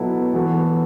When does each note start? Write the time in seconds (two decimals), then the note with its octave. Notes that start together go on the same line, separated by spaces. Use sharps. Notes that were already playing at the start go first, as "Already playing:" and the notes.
Already playing: B2 F#3 B3 E4 A4
0.34 E3 B3 F#4 A4